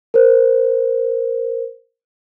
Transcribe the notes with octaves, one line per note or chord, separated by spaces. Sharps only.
A#4 C5